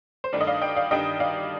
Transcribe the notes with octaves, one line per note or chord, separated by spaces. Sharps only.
C5
G2 D#3 A3 D4 D5
D#5
D5 F5
D#5 G5
D5 F5
G2 D#3 G3 D4 D#5 G5
D5 F5